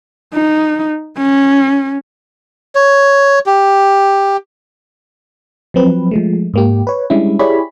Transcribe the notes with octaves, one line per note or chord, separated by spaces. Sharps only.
D#4
C#4
C#5
G4
F3 F#3 C4 B4
F3 G#3 A3
G#2 A#3 G4
B4 C#5
G3 G#3 C#4 D4 E4
E4 G4 G#4 C#5 D5 B5